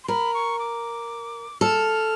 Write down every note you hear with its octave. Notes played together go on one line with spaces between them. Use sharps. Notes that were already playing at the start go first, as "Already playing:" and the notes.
C6
A#4 B5
C#6
D6
A4 F6